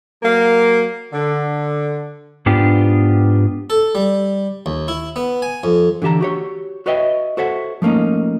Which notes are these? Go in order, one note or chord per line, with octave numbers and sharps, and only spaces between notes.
F#3 A#3
D3
G#2 B3 D4 F4 G4
A4
G3
D#2
E4
B3
G#5
F2
D3 E3 G4 A5 A#5
F#4 G4 C#5
F#4 B4 C#5 D#5 E5 G5
F#4 A4 C5 C#5 E5 F#5
F3 A3 A#3 C#4 D#4